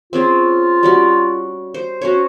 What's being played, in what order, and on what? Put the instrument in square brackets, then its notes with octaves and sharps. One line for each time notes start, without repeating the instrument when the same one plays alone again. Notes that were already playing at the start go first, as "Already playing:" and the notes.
[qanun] C4 C#4 G#4 [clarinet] F4
[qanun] G3 C#4 F#4
C5
[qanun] C#4 C5 C#5 [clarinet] F#4